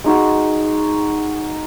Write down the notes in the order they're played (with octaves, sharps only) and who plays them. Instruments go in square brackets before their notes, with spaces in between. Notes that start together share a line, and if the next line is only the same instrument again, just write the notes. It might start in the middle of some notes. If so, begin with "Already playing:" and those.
[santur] G#3 D#4 F#4